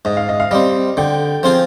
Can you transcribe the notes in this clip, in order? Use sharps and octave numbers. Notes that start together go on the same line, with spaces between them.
G#2 D#5
F5
D#5
F5
G3 C4 D#5
D3 G5
F3 C4 F4 G#4